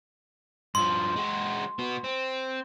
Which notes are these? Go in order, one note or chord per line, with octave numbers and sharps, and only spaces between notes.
G2 F3 C6
G#3 F#4
B3 F#4
C4